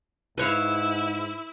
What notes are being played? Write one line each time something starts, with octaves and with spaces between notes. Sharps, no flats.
G#2 E4 B4 C#5 F5